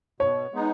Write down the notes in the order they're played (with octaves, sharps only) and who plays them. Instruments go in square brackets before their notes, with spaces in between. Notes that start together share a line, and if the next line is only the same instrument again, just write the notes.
[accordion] B2 [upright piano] C#5
[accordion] G#3 B3 D#4